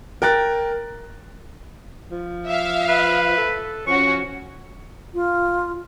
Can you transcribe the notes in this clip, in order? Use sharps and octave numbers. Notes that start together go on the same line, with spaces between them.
A#4 G5 F#6 A6
F3
E5 F5
B4
A4
F3 C#4 F#4 C#6
F4